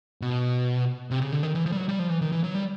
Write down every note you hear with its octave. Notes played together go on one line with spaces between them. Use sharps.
B2
C3
C#3
D3
D#3
E3
F3
G3
F#3
G3
F3
E3
D#3
E3
F#3
G3